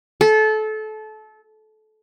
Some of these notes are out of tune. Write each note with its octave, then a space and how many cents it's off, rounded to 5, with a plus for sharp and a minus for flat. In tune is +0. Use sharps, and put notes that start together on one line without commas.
A4 -25